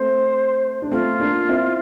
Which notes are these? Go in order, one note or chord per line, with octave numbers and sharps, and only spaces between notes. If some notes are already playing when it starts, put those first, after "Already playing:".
Already playing: A3 C4 C5
D4
A3 C4 F4
A#3 D4
C4 E4